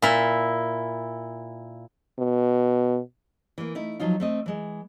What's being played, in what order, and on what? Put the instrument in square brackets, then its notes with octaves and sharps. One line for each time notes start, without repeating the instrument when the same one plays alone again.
[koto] A#2 E4
[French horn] B2
[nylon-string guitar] E3 A#3
A3 D#4 E4
F3 F#3 D#4 F4
A3 C4 D#5
E3 G#3